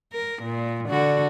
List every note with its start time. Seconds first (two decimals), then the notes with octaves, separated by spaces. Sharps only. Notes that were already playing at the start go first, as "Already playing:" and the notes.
0.12 A#4
0.42 A#2
0.89 D3 F#4